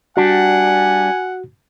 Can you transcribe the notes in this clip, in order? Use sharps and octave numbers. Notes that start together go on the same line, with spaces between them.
G3 D4 F#4 F#5 G#5